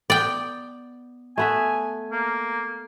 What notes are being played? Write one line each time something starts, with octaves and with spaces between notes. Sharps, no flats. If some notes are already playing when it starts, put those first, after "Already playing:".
B3 D5 G5
A3 B3 E5 G#5
A#3